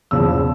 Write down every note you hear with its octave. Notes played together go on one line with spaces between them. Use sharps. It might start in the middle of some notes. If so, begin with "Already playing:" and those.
E2 C#3 F3 E6